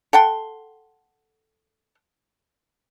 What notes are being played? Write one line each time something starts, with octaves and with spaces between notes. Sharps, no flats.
A4 F#5 G5 C6